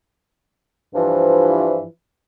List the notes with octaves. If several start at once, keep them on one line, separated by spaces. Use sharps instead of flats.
G2 E3 F3